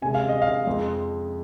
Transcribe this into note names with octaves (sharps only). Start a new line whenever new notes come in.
C3 G#3 G#5
F5
D#5
F5
F2 F3 G#3